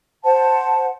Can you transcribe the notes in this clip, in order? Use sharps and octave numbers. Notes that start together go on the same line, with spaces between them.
C5 F#5 A5